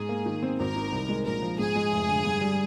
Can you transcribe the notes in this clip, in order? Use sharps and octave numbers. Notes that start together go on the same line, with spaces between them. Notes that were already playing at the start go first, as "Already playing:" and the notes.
Already playing: G#2 G#4
A#3
D#3
C4
G#1 A#4
D#3
C2
G#3
A#1 A#4
F3
G#2 G#4
G#3
F1
D3
G2
G3